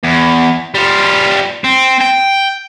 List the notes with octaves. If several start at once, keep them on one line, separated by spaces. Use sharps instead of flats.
E2
G3 F4
C4
G5